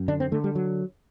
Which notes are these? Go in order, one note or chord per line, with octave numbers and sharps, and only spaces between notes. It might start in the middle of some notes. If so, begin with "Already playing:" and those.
Already playing: F#2
D3 D4
C4
D3 A3
G3
F#3